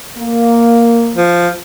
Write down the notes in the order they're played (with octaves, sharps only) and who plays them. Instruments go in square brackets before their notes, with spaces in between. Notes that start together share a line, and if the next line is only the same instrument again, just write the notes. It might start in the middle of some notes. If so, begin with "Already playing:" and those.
[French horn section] A#3
[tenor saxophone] F3